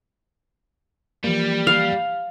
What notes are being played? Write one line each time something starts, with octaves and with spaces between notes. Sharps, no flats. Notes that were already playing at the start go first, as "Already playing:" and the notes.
E3 F3 G3 A#3
F5